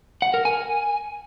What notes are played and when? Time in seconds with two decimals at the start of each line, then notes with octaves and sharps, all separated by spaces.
0.22 F#5
0.34 A#4
0.45 G#5